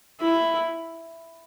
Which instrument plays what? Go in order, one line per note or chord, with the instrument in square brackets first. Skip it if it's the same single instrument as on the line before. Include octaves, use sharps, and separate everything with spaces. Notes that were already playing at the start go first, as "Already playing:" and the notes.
[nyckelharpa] E4